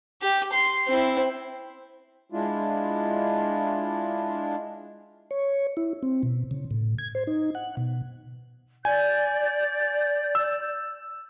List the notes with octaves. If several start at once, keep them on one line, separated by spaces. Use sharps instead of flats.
G4
C6
C4 E4
G#3 D4 E4 F4
C#5
E4
C4
B2
C#3
A2
G#6
C5
D#4
F#5
B2
D5 G#5 G6
E6